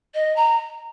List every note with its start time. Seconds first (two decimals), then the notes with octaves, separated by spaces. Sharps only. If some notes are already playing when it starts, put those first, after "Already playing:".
0.14 D#5
0.36 A#5